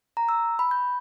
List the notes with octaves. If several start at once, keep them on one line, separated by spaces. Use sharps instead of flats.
A#5
E6
B5
G6